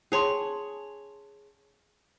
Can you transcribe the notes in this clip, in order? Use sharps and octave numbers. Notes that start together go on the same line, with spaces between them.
C#4 G#4 C#5 A5 C6